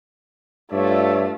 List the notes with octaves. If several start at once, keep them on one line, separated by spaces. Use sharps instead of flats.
G2 A3 F4 C#5 D5 E5